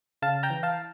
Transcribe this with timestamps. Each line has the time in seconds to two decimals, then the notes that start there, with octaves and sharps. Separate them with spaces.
0.22 C#3 F5 A5
0.43 G5 A#5
0.50 E3
0.63 F5 A5